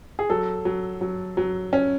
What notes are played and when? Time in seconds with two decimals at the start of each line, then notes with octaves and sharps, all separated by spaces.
0.19 G#4
0.30 F#3 A4
0.65 F#3
1.01 F#3
1.37 F#3
1.73 C#4